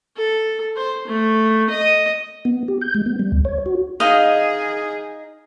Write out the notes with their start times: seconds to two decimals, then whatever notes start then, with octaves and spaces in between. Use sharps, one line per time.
0.17 A4
0.76 C5
1.08 A3
1.70 D#5
2.45 B3
2.68 G4
2.81 G6
2.95 G#3
3.06 B3
3.19 G3
3.32 D2
3.45 C#5
3.66 F#4
4.00 D#4 G#4 D#5 F5